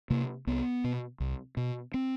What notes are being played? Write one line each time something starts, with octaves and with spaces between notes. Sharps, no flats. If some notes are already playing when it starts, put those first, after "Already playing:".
C3 A#3
C2 B3
B2
C2
B2
C4